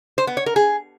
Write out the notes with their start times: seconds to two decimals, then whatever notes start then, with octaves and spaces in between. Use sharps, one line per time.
0.18 C5
0.27 B3
0.37 C#5
0.46 A#4
0.56 G#4